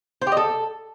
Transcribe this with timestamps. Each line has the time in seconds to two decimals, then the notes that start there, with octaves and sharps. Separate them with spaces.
0.22 C5
0.27 G4
0.32 D#5
0.37 A4